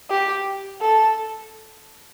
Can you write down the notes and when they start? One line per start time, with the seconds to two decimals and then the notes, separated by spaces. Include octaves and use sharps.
0.10 G4
0.81 A4